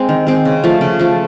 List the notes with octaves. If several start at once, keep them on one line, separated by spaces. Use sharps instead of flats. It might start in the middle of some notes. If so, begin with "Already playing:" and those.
Already playing: G#3 C4
D#3
G#3 C4
C#3
F3 A3
C#3
F3 A3